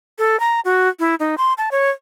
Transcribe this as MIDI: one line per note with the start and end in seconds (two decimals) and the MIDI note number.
0.18 0.39 69
0.40 0.60 82
0.65 0.88 66
0.99 1.15 64
1.20 1.35 63
1.38 1.53 84
1.58 1.69 81
1.71 1.90 73